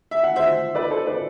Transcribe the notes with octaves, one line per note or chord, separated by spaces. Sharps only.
E5
F#5
C5 E5
B4 D5
A4 C5
B4 D5